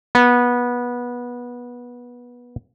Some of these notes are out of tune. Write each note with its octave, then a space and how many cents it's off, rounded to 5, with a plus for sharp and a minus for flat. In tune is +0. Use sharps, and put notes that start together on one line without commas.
B3 -20